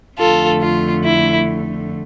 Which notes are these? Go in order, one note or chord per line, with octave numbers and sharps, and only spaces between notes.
F2 D3 A3 F4 A4
F4
E4